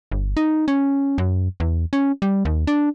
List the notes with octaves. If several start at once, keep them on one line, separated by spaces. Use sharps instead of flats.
G1
D#4
C#4
F#2
E2
C#4
G3
D#2
D4